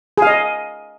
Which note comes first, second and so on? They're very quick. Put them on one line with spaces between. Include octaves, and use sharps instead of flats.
G#4 F5 D#5